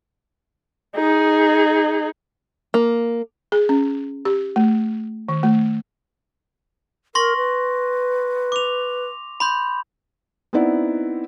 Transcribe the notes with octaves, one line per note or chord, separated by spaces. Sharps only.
D#4 G#4
A#3
G#4
C#4
G4
A3
D#3
A3
A#4 C6 C#6 A#6
B4
D6 F7
B5 C6 G6
B3 C4 D#4 E4 D5 F#5